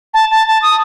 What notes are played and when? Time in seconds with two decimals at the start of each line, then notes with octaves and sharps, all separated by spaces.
0.14 A5
0.31 A5
0.48 A5
0.62 D#6